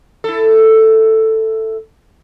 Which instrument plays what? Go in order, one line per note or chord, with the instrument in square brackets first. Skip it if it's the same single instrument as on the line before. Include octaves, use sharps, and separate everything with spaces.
[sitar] E4 A4